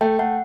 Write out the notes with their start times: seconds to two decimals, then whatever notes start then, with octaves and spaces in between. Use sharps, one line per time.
0.01 A3 G5
0.19 A3 F#5